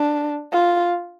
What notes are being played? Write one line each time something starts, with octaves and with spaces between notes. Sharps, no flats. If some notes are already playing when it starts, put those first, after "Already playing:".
Already playing: D4
F4